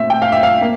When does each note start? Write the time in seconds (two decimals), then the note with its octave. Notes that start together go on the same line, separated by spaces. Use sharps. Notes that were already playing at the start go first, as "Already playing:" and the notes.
Already playing: A#2 A3 C4 E5
0.10 G5
0.22 F5
0.32 E5
0.43 F5
0.61 A#3